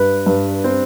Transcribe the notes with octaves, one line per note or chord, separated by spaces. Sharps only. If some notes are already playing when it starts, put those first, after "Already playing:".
Already playing: G2 B4
G2
C4